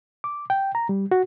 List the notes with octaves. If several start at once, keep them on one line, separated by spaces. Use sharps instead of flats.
D6
G5
A#5
G3
F#4